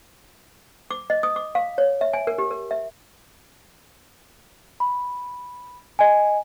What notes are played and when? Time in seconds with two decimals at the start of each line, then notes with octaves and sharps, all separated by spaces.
0.91 D6
1.10 D#5
1.23 D#6
1.36 D6
1.55 F5
1.78 C#5
2.01 E5
2.13 G#5
2.27 A#4
2.38 G4
2.51 A#4
2.71 E5
4.80 B5
5.99 D#5 G#5